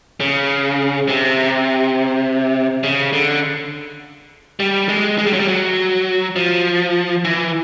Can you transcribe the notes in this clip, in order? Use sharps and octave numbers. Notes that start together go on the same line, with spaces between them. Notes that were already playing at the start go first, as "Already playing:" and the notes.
C#3
C3
C#3
D3
G3
G#3
G#3
G3
F#3
G3
F#3
F3
E3